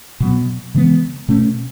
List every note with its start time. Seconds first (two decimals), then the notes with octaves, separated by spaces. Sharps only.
0.20 B2 F#3 B3
0.75 C#3 E3 G#3 B3
1.28 B2 A3 C#4